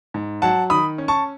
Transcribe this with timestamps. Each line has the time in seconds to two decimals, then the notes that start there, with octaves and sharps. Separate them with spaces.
0.14 G#2
0.42 F#3 F#5 A5
0.70 D#3 B5 D#6
0.98 C#4
1.08 A5 C#6